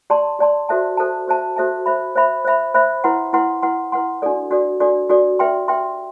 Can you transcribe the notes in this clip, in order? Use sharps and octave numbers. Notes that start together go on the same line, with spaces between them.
G4 D5 A5 C6
G4 D5 A5 C6
F#4 A4 C5 E5 A5
F#4 A4 C5 E5 A5
F#4 A4 C5 E5 A5
F#4 A4 C5 E5 A5
C5 E5 B5
C5 E5 B5
C5 E5 B5
C5 E5 B5
E4 B4 F#5 C6
E4 B4 F#5 C6
E4 B4 F#5 C6
E4 B4 F#5 C6
D4 F#4 A4 D5
D4 F#4 A4 D5
D4 F#4 A4 D5
D4 F#4 A4 D5
G4 B4 E5 G5 C6
G4 B4 E5 G5 C6